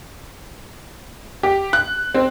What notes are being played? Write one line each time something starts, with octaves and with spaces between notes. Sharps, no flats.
G4
F#6
C4